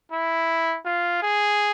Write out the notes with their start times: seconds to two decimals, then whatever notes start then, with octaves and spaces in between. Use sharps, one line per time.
0.12 E4
0.85 F4
1.22 G#4